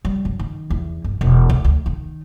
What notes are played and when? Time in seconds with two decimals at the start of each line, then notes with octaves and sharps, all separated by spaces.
0.05 G3
0.25 F#2
0.39 D#3
0.70 E2
1.04 G1
1.21 E1
1.50 D2
1.64 D2
1.86 D#3